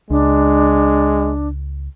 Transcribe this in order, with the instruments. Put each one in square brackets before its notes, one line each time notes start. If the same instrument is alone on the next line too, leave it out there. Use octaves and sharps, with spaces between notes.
[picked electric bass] C#2 [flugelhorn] G#3 [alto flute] D4